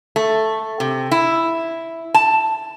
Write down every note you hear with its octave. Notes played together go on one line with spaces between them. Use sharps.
A3
C3
E4
A5